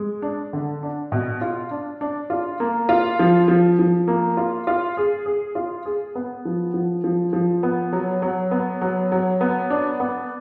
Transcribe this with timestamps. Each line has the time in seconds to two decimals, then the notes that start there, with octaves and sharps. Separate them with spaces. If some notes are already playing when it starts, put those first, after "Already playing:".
Already playing: G#3
0.22 D4
0.53 D3
0.83 D4
1.12 B2
1.41 F4
1.71 D4
2.01 D4
2.30 F4
2.60 A#3
2.89 F4
3.19 F3
3.48 F3
3.79 F3
4.08 A#3
4.37 F4
4.67 F4
4.97 G#4
5.26 G#4
5.55 F4
5.85 G#4
6.15 B3
6.45 F3
6.74 F3
7.04 F3
7.33 F3
7.63 B3
7.93 F#3
8.22 F#3
8.51 B3
8.81 F#3
9.12 F#3
9.41 B3
9.70 D4
10.00 B3